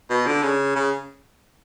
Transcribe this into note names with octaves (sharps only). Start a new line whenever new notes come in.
B2
D3
C#3
C#3